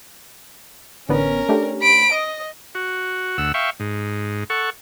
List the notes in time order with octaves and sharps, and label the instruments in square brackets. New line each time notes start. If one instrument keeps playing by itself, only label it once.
[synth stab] A1 D3 B3 [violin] C#4 A#4
[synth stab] A3 D4 G4
[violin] B5 D7
[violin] D#5 [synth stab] D#6
[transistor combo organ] F#4
D2 F#5 E6
E5 F5 G5 C#6
G#2
A4 F#5 C#6